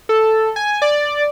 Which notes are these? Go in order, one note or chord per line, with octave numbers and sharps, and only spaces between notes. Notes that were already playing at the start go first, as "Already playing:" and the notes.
A4
G#5
D5